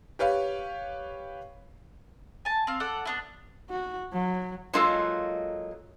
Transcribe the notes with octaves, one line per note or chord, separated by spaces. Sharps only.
G4 B4 C#5 F5
G#5 A5
C4 F5
A4 D5 F#5
B3 D4 E4
F#4
F#3
F#3 G#3 A#3 D#4 F4 A4